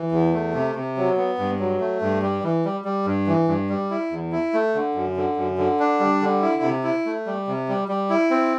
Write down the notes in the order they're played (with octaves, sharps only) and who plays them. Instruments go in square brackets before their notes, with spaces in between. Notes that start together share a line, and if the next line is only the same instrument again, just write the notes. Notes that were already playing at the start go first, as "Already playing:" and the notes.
Already playing: [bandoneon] E3
E2
A3
C3
C3
F#3
B3
G2
F#3
A3
G2
G3
E3
G3
G3
G2
E3
G2
G3
E4
E2
E4
A3
D3
F#2
D3
F#2
D3
D4
G3
D3
E4
C3
E4
A3
G3
C3
G3
G3
E4
C4